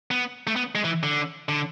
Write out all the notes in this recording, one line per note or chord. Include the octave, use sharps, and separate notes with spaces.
B3
A3
B3
G#3
E3
D3
D3